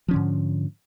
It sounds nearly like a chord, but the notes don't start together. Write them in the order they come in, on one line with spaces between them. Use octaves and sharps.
F3 C#4 D3 G#2